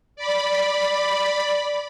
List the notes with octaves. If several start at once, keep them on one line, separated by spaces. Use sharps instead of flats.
D5 B5